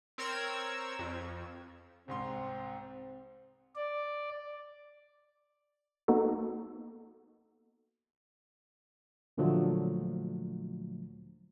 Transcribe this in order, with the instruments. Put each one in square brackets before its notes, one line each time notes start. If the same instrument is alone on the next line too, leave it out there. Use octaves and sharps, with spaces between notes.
[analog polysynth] C4 A#4 C#5 E6 G#6
F2
[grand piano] C2 G#2 C6 [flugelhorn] C4
[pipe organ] D5
[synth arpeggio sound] A#3 B3 D#4 F#4 A4
[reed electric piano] D2 A#2 D3 F3 F#3 A3